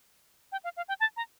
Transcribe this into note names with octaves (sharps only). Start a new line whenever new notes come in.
G5
F5
F5
G5
A5
A#5